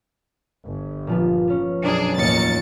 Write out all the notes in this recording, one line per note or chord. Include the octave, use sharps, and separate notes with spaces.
G1
A#2 F3 B3
B3 C#4
B1 F#2 D4 G#4
F1 D#2 A2 D#5 A6 C#7